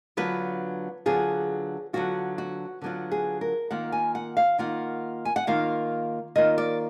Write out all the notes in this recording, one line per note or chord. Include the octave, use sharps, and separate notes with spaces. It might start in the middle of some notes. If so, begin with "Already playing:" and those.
D3 F#3 B3 F4 B4
D3 F#3 B3 F4 G#4
D3 F#3 B3 F4 F#4
F#4
D3 F#3 B3 F4
G#4
A#4
D#3 A#3 F4 F#5
G#5
F#5
F5
D#3 A#3 F4 F#5
G#5
F#5
D#3 A#3 F4 F5
D#3 A#3 F4 D#5
D5